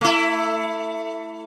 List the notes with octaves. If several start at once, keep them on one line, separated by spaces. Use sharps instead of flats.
A3 E4